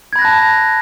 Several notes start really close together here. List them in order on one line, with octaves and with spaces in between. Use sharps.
G#6 B5 A#6 F#6 A5